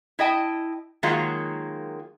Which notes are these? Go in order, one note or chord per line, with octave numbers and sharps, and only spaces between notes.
E4 D#5 G5 A5
D#3 F#3 G#3 A#3 F4 F#4